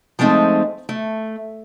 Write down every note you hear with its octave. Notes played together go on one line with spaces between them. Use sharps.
F3 G#3 A3 C4 D#4
A3